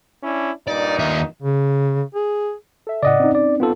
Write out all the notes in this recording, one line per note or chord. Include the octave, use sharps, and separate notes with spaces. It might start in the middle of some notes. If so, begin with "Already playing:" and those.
C#4 D4 E4
G2 A#2 D#4 D5
D#2 E5
C#3
G#4
A4 E5
A2 C#3 D5 D#5 F#5
C4 C#4 D#4
D5
B3 F4 A4